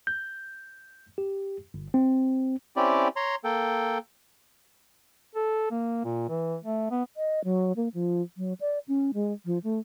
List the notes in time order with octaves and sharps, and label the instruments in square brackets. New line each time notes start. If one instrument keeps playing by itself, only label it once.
[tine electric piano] G6
G4
G1
C4
[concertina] C4 C#4 E4 G4 D5
C#5 A#5 C6
A#3 A4 G5
[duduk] A4
A#3
A#2
E3
A3
B3
[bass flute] D#5
F#3
A#3
F3
F#3
D5
C#4
G#3
F3
A3